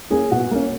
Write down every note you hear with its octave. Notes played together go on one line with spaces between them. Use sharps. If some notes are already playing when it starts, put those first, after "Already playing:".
A#3 C#4 G#4 G#5
B2 F#4 F#5
A#3 C#4